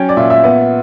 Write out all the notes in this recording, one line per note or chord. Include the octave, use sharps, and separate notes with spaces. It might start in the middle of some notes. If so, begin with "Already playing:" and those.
Already playing: F#3 C#4 G5
D5
A#2 E5
E5
B3